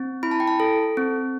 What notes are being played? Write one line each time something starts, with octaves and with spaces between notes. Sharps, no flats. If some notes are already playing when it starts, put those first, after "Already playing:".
Already playing: C4
E4 B5
A5
G5
A5
A4
C4